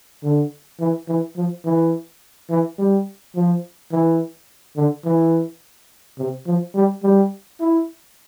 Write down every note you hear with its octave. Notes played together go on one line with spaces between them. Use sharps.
D3
E3
E3
F3
E3
E3
G3
F3
E3
D3
E3
C3
F3
G3
G3
E4